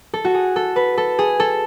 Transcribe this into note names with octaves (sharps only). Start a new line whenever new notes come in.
A4
F#4
G#4
A4
B4
A4
G#4
A4